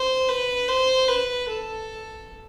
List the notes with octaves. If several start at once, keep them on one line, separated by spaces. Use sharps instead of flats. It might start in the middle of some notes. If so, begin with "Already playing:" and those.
Already playing: C5
B4
C5
B4
A4